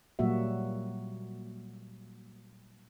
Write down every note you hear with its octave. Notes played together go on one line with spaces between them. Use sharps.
A#2 F#3 G3 A#3 F#4 E5